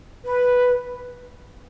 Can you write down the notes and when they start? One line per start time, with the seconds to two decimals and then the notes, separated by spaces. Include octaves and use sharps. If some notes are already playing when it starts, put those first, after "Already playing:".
0.24 B4